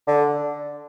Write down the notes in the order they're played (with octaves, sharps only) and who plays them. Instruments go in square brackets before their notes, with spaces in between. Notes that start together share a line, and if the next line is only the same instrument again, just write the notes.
[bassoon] D3